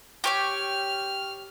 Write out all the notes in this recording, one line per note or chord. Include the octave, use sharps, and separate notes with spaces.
G4 C#5 G5 F6